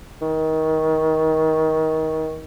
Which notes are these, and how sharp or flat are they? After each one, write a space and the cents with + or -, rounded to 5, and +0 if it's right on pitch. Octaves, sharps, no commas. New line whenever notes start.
D#3 +25